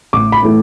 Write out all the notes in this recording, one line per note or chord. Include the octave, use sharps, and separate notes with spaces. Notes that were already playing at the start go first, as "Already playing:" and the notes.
A1 D6
B5
A2 E3 A3